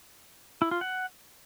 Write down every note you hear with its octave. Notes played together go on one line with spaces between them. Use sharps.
E4
F4
F#5